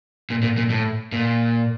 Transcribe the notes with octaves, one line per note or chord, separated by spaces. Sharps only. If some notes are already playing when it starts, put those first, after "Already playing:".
A#2
A#2
A#2
A2
A#2